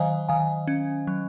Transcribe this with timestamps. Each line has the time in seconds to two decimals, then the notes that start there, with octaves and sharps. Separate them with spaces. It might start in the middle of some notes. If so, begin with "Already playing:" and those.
Already playing: D#3 F#3 C5 D#5 F5 G#5
0.29 D#3 F5 G#5
0.67 C#4
1.07 F#3